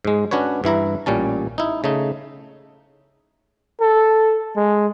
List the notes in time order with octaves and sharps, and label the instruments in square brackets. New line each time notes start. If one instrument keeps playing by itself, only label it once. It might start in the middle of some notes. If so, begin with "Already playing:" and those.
[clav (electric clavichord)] G#2 G#3
C#4 D4 F#4 B4 C#5
G2 E3 E4 A#5
A1 A#2 G3 C#4 A5
D#4 E4
C#3 A3 D#4
[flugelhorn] A4
G#3